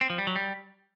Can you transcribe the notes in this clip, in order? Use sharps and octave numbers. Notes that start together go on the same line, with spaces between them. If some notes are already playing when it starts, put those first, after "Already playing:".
C4
F3
G3
F#3
G3